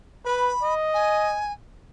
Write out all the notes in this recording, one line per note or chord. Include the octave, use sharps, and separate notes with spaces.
B4 B5
D#5
G#5